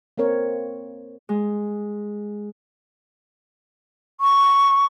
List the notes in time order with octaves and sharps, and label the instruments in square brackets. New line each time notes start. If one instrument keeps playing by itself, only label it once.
[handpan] A#3 C4 A#4 C#5
[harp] G#3
[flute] C#6